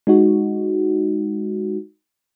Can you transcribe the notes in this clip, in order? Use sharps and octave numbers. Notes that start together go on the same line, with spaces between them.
G#3 D#4 F#4